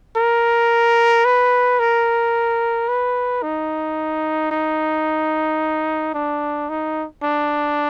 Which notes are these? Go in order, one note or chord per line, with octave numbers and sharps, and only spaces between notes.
A#4
B4
A#4
B4
D#4
D#4
D4
D#4
D4